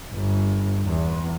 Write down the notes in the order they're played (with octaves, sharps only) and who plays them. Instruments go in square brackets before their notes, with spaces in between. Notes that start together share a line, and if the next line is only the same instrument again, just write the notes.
[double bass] G1
E2